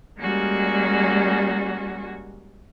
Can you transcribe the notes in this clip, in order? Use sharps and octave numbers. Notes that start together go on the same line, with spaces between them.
G3 G#3 A#3 C#4 F#4